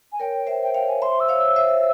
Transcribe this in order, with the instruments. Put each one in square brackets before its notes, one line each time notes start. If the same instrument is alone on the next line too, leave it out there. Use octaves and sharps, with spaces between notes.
[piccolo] G#5
[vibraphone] A#4 C#5 [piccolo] G5
[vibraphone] C5 E5
[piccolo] G5
[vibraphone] C#5 F5 [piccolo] G5
[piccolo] G#5
[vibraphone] C5 E5 [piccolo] C6
[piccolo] E6
[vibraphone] C#5 F5
[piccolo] E6
[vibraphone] C5 E5 [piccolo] E6